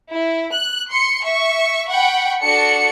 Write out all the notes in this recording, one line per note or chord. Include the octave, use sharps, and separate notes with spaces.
E4
F#6
C6 C#7
E5 C#6
F#5 G5 B5 C#6
D4 F#4 A4 C#7